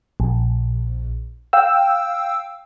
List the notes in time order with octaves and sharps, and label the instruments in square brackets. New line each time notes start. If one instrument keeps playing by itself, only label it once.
[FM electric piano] A#1
F5 G5 E6